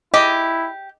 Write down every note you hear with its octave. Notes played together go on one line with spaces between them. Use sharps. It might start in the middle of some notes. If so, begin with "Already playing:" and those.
E4 G4 D#5